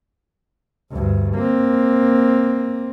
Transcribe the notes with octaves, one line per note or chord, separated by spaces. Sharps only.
D2 G2
A#3 C4